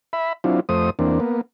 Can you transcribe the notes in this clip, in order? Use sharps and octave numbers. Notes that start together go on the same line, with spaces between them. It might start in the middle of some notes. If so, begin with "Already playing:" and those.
E5 B5
F#3 C4 D4 E4 F4
F2 A3 C5 D#6
E2 A#3 C4 D4
A#3 B3